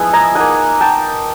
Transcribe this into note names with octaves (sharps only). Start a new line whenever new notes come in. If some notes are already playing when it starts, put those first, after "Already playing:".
Already playing: F3 G#3 B3 E4
G#5 A#5
A#3 D#4 F#5 G#5
G5 A5